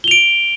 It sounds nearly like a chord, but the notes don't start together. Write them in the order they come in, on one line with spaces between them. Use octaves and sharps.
G7 F7 D7